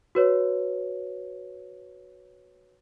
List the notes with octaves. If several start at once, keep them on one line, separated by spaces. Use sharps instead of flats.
F#4 B4 C#5